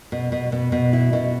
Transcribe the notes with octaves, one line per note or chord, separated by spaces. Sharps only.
B2
B2
B2
B2
E4
B2